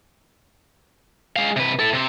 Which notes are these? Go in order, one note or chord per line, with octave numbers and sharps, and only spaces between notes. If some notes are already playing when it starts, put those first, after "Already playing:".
G#3 F5
C3 B4
E4 A4
C3 C4